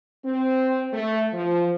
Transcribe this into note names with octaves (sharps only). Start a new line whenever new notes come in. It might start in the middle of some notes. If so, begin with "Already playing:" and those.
C4
A3
F3